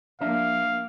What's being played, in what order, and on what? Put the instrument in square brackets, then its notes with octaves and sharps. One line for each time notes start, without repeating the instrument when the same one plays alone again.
[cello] F3 A#3 [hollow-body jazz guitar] D4 E5 A#5 [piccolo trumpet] F5